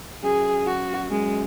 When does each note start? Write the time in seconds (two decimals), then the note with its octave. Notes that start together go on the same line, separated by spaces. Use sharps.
0.23 F#2 G#4
0.67 F#4
1.11 F#2 G#3